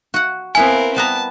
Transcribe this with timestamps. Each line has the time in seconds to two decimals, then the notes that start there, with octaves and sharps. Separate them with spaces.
0.14 F#4 F#5
0.55 B3 C4 E4 A#4 F5 G#5
0.96 G3 B3 A5 A#5